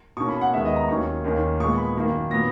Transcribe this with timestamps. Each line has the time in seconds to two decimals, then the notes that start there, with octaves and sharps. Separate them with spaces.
0.17 B2 A#3 C#4 C#6
0.29 B5
0.41 F#5
0.52 D#2 D#3 G#3 B3 E5
0.65 D#5
0.76 A#5
0.88 D#2 D#3 F#3 A#3 C#4 C#6
1.24 D#2 D#3 A#3 C#4
1.60 A#2 G#3 B3 C#6
1.78 B5
1.96 F#2 D#3 A#3
2.31 A#2 F#3 B3 A#6